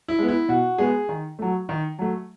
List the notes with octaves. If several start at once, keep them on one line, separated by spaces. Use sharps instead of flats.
E4
G#3 B3
E4
B2 F#4
G#3 B3 G#4
D#3
F#3 A3
D#3
F#3 A3